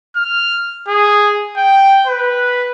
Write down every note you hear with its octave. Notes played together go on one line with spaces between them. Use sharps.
F6
G#4
G5
B4